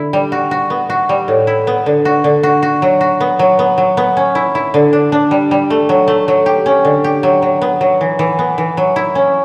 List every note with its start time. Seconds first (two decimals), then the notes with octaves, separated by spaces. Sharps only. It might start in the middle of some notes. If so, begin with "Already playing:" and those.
Already playing: D3 E4
0.13 G3
0.32 F#4
0.51 F#4
0.70 B3
0.90 F#4
1.09 G3
1.28 A2
1.47 E4
1.67 B3
1.86 D3
2.05 F#4
2.24 D3
2.43 F#4
2.62 F#4
2.82 F#3
3.01 F#4
3.20 B3
3.39 F#3
3.59 B3
3.78 F#3
3.97 B3
4.17 C#4
4.35 E4
4.55 E4
4.74 D3
4.93 D4
5.12 D4
5.31 G3
5.51 G3
5.70 A3
5.89 F#3
6.08 A3
6.28 F#3
6.46 G4
6.66 C#4
6.85 D3
7.04 G4
7.23 F#3
7.42 F#3
7.62 B3
7.81 F#3
8.01 E3
8.19 E3
8.39 B3
8.58 E3
8.77 F#3
8.96 E4
9.15 C#4